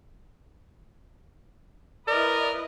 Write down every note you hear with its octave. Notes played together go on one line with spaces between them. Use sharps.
E4 A#4 B4 D5 D#5